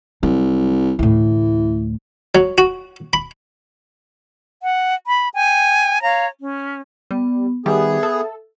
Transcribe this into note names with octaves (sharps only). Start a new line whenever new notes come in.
C2 F#3
D2 A2 E3
F#3
F#4
B5
F#5
B5
G5 G#5
C#5 F5 A#5
C#4
G3 B3
D#3 G3 B3 G4 G#4 E5
A4